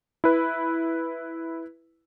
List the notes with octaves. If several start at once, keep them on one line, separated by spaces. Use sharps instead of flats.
E4 B4